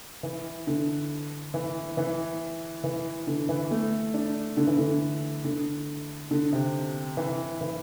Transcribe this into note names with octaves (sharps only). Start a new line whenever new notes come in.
E3
D3
E3
E3
E3
D3
E3
A3
D4
D3
E3
D3
D3
D3
C3
E3
E3